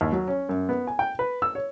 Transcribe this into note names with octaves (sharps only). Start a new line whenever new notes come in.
D#2
F#3
C#4
F#2
B3
G#5
G5
B4
E6
C#5